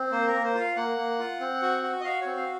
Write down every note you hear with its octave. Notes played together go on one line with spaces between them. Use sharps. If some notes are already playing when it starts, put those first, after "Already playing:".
Already playing: C4
A#3 C5
A#4
A#3
C5
F4
F5
A#3 F#5
A#3
F4
C4
F#4
F#4
D#5
F#4 F5
C4 C#5
F5